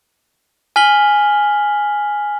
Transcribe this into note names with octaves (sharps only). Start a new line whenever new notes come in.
G#5 F6 B6 F#7 G7